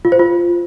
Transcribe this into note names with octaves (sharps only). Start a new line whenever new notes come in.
F4
C5
F4